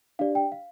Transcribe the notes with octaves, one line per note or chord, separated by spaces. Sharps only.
D4 G4 D5 F5
G5
F5